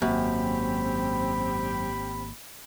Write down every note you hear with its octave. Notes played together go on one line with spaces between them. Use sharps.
G#1 F#2 A#3 C4 G4 B5